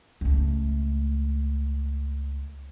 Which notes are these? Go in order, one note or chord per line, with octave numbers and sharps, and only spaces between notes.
C#2 A3